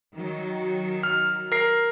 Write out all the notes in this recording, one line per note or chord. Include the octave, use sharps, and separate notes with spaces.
D#3 F#3
F6
A#4 C7